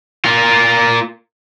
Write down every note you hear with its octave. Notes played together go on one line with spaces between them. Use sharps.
A#3 F4